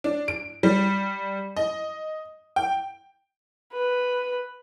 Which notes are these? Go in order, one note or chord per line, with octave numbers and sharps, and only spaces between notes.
D4
D7
G3
D#5
G5
B4